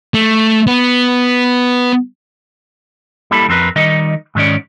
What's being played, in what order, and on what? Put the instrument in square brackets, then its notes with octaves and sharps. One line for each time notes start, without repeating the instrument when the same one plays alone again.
[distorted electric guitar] A3
B3
[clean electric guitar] G3 A#3 E4 A4 B5
F2 C4 A#4 B4
D#3 G3 D#4 D#5
G#2 D#3 C#4 D5